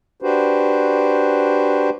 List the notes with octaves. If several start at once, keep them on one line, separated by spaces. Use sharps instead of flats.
D4 F#4 G4 B4 C5